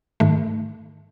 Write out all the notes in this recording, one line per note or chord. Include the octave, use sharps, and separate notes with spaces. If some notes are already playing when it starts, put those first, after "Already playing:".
G#2 D#3 A3